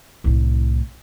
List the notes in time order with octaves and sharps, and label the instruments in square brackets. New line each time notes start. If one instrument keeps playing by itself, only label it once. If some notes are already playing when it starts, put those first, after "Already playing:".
[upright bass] C2 A2